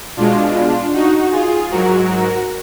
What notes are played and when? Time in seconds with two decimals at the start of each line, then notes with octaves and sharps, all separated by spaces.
0.17 B2 G#3 D4 F4
0.93 D#4 F#4
1.32 F4 G#4
1.70 G#2 F#3 F#4 A#4